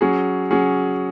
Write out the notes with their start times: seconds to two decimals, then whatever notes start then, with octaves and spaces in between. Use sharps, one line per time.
0.01 F#3 C#4 G#4
0.51 F#3 C#4 G#4